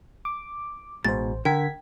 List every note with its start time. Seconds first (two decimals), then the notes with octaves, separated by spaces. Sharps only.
0.25 D6
1.05 A1 G#2 B2 C5 A6
1.45 D3 A#4 G5 G#6 B6